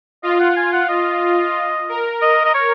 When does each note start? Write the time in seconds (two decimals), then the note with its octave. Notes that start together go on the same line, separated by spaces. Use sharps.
0.23 F4 D#5
0.40 F#5
0.57 G#5
0.73 F#5
0.89 D#5
1.89 A#4
2.22 D#5
2.45 D#5
2.55 C#5